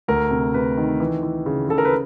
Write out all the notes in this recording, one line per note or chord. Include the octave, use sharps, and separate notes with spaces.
D2 A#4
C3
C3 B4
D#3
E3
E3
C#3
C#3 A4
A#4
B4